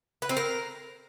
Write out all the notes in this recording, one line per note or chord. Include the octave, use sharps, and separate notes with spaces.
B4
C4
A#4